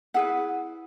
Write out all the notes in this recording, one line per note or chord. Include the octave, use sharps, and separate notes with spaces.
E4 G#4 B4 F#5